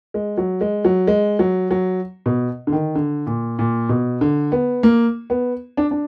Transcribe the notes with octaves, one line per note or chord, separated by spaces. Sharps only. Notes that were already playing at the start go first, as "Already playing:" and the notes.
G#3
F#3
G#3
F#3
G#3
F#3
F#3
B2
D3
D#3
D3
A#2
A#2
B2
D3
B3
A#3
B3
D4
D4